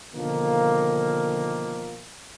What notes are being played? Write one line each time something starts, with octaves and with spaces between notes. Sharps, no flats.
B2 D3 D#3 F3 A#3